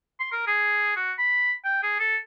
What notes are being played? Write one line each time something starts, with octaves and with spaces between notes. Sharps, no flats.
C6
A#4
G#4
F#4
B5
G5
G#4
A4